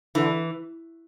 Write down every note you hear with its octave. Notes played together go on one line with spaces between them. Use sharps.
D3 E3